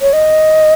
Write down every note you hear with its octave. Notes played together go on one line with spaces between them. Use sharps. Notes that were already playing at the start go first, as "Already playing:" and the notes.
C#5
D#5